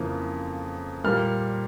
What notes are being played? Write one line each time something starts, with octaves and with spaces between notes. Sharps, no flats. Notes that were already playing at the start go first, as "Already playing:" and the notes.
Already playing: F2 C#3 E3 A#3
A#2 G3 A#3 F6